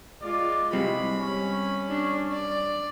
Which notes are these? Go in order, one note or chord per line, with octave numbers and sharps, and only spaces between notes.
G#3 F4 D5
G3 G#3 C4 B5
C#4
D4
D5